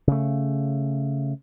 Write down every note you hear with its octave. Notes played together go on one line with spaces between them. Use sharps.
C#3 A3